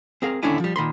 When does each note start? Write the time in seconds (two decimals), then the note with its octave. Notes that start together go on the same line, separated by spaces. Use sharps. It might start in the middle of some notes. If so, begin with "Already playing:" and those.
0.22 C4 G#4 A#4 F5
0.43 D#2 D3 C#4 D4 E4 G#5
0.60 F3 G3
0.76 A#2 D#3 B5 C6